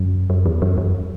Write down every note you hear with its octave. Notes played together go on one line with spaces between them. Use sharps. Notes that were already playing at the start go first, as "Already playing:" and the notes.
Already playing: F#2
F#2
E2
F#2
F#2